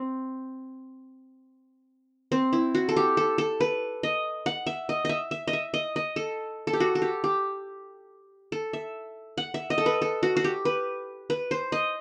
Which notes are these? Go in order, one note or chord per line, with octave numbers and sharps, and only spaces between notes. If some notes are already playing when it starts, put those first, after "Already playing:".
Already playing: C4
C4
E4
F#4
A4
G4
A4
A4
B4
D#5
F#5
E5
D#5
D#5 E5
E5
D#5
E5
D#5
D#5
A4
A4
G4
F#4
A4
G4
G4
A4
E5
F#5
E5
D#5
A4
B4
A4
F#4
F#4
G4
B4
B4
C5
D#5